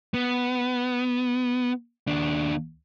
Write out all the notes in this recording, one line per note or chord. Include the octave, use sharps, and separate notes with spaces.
B3
D#2 D4